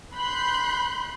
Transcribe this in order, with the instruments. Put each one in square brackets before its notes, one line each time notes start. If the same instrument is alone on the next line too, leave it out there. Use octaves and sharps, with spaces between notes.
[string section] B5 C6 F#6 G6